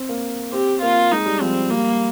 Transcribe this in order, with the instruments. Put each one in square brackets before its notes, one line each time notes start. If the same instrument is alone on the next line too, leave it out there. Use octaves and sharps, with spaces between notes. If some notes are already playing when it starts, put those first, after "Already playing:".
Already playing: [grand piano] C4
A#3
[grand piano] C4 [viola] G4
[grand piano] A#3 [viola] F4
[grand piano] G#3 [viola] D#4
[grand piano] G3
[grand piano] F3 [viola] C4
[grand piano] G3 [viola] A#3